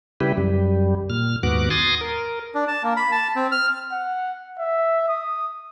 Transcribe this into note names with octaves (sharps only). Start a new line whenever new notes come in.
C#3 G3 E4 G4 B4
F#2 G3
A#2 F6
D#2 G#2 B3 F#4 D6 F#6
G#5 C6 D#6 A6 A#6
A#4
D4
A5
A#3
B5
A5
C4
F6
F#5
E5
D#6